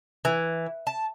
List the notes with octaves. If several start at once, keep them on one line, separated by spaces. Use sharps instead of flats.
E3
A5